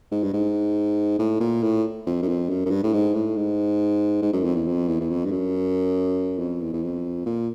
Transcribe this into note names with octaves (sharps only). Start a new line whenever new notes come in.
G#2
G2
G#2
A2
A#2
A2
F2
F#2
F2
F#2
F#2
G2
A2
G#2
A2
G#2
G#2
F#2
F2
E2
F2
E2
E2
F2
G2
F#2
F2
E2
E2
F2
A#2